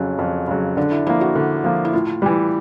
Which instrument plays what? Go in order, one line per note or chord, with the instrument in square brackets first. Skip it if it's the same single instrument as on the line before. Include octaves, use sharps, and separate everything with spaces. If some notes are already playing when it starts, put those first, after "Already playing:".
Already playing: [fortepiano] F2 C#3 F#3 [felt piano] C#4
[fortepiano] F2
C#3 F#3
[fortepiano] D3 [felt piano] D4
[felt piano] E4
[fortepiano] F3 A#3 [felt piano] E4
[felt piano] F#4
[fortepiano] D3
F3 A#3
[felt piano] E4
[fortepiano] A2 [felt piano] F4
[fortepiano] E3 G3